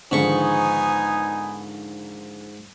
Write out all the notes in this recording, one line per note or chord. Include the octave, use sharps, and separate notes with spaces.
G#2 D3 D#3 F3 B3 D#4 G#5 C#6